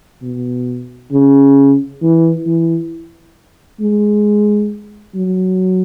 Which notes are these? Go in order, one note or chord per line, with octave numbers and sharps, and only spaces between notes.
B2
C#3
E3
E3
G#3
F#3